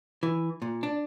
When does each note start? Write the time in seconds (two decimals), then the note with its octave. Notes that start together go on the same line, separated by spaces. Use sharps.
0.23 E3
0.62 A#2
0.83 D4